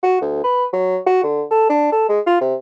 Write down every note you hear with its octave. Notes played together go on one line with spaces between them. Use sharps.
F#4
D2
B4
F#3
F#4
D3
A4
D4
A4
G#3
F4
C3